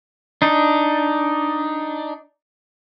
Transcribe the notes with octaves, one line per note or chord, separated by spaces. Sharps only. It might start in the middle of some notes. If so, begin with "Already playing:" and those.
D4 D#4